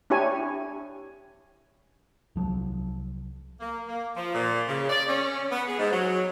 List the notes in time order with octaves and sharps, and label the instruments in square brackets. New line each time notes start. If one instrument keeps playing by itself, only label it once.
[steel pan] D4 E4 G4 C#5 G#5
[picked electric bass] C2 F3 F#3
[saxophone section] A#3
A#3
F3
A#2
C#3
D5
C#4
B3
G#4
G#2
F#3